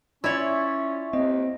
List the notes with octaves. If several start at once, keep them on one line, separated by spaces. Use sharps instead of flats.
C#4 E4 F4 C#5 D5 E5
D#2 C4 D#5